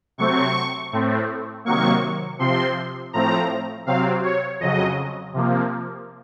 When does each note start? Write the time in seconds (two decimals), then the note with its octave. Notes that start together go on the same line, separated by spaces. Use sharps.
0.18 C3 F#3 A3 C4 C#6
0.92 A2 A3 C4
1.65 C3 D#3 F#3 A#3 C#6
2.39 C3 F3 C4 C6
3.13 A2 F3 A3 C4 A#5
3.86 C3 F#3 C4 F5
4.23 C#5
4.60 F2 C#3 F#3 D#5
5.33 C3 F3 A#3